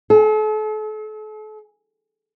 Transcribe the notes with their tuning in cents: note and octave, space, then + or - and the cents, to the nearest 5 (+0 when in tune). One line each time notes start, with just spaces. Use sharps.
A4 -40